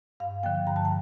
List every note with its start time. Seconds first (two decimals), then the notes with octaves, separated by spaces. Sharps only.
0.20 G2 F5
0.43 D3 F3 A#3 G5
0.67 G2 A#5
0.76 A5
0.85 G5